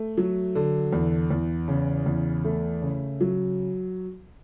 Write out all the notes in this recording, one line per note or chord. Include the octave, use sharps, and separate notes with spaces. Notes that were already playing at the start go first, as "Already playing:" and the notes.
Already playing: A3
F#3
D3
E2
E2
C#3
E2
A3
C#3
F#3